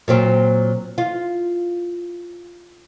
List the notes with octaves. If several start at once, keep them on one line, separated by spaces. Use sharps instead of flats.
A#2 F#3 C4
F4